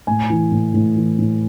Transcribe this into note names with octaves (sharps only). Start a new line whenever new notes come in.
A2 G#5
E3
A2
A2
E3
A2